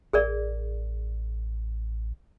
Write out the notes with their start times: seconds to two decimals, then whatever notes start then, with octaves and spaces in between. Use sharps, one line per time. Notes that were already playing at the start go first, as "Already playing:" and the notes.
0.13 A1 G#4 A#4 D5